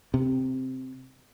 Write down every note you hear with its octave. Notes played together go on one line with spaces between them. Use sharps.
C3